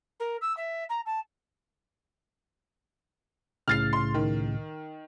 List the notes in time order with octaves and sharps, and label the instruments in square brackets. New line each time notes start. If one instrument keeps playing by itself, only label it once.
[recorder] A#4
E6
E5
A#5
A5
[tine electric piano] C2 A2 C#3 [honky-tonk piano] F6 A6 C7
[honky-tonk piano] C6
D#3